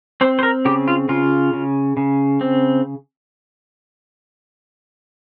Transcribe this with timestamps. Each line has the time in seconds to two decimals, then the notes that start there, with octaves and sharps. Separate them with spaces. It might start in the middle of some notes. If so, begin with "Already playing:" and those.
0.21 C4 C5
0.39 C5
0.43 A#4
0.65 C#3 G4
0.88 F4
1.09 C#3 F4
1.53 C#3
1.97 C#3
2.41 C4